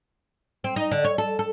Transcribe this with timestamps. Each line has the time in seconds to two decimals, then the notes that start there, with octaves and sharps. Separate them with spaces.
0.64 C4
0.76 D#4
0.91 D3
1.04 C#5
1.18 A4
1.39 A4